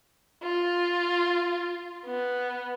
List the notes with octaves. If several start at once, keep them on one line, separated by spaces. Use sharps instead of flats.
F4
B3